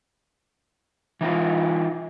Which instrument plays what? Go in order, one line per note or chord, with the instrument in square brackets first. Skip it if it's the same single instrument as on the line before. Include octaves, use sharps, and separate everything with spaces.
[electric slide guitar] E3 D#4 F4